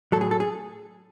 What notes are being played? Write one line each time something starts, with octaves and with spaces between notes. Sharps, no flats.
A2 F#3 A4
G#4
A4
G#4